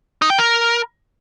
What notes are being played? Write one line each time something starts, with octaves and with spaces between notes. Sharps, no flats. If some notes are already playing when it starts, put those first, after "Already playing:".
D#4
G5
A#4